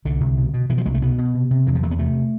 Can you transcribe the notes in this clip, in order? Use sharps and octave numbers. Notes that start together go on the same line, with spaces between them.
C2 D3
C2
B2
B2
B2 E3
F3
C2 G#3
A3
B2 B3
B2
C3
C3
E2 E3
F3
E2 A3
B3
C3 A3